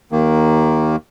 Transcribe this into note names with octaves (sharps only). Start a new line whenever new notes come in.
D#2 D#3 A#3